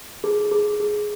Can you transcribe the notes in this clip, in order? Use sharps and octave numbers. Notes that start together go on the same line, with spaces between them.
G#4
G#4
G#4